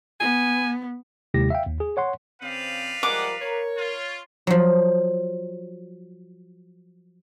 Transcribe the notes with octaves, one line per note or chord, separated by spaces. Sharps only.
B3 G#5
D#2 C3 G#3 E4 G4 A#6
E5 F5 G5
D#2
G#4
C#5 F#5 C6
C#3 C4 B4 D5 F5
F3 G3 G#3 A#4 F#5 D6
A#4 C#5
F4
F3 F#3